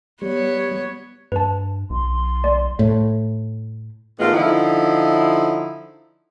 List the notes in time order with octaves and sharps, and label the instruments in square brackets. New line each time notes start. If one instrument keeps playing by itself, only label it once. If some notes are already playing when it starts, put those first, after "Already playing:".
[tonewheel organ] G3 [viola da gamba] B3 C#5
[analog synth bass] G2 [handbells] B4 A5
[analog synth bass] B1 [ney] C6
[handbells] D5
[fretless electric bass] A2
[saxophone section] A2 D#3 G#3 B3 F4
D3 F3 D#4 E4